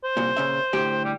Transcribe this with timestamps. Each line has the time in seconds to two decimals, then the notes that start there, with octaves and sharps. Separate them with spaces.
0.04 C5
0.17 C2 A#2
0.36 A#2 C#3 E5
0.73 D2 A2 G4
1.04 G3